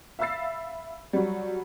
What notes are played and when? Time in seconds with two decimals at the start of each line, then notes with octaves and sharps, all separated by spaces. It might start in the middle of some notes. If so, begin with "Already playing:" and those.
0.19 E5 F5 B5 E6 A6 C7
1.13 F#3 G3